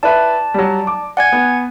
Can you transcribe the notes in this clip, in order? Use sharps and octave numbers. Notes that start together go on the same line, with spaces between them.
E4 B4 D5 E5 A5
F#3 G3
D6
D5 F#5 G#5 G#6
B3